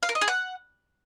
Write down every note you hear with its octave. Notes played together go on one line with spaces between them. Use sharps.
F5
A#4
D#5
G#4
F#5